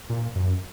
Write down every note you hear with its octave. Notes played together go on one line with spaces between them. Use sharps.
A#2
F#2